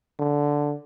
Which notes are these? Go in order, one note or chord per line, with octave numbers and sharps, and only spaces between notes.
D3